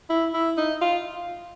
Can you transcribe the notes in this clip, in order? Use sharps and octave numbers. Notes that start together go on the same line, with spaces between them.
E4
E4
D#4
F4